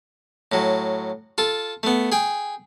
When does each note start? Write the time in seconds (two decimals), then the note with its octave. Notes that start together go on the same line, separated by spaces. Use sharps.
0.52 A2 F#3
1.38 F4 A4
1.83 A3 B3
2.12 G#4 G5